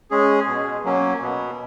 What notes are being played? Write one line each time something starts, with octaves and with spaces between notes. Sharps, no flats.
G#3 C#4 G#4
B2
F#3 A#3 C#4
B2